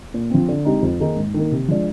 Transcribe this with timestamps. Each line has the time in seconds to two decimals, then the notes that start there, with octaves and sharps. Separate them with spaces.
0.14 A#2
0.30 F3 C4
0.48 D3
0.65 G#3 C4 D#4 G4
0.82 F2
1.00 D#3 A#3 D#4 G#4
1.17 G#2
1.34 D#3 A#3
1.52 C3
1.68 F3 G#3 D4